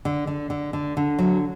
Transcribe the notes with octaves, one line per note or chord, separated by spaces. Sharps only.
D3
D3
D3
D3
D3
F#3